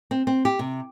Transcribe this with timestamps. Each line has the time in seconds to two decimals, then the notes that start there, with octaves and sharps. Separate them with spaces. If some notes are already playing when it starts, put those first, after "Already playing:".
0.11 C4
0.27 C4
0.45 G4
0.59 C3